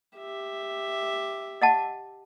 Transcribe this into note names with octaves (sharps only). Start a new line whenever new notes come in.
G4 E5
D#5 F#5 A5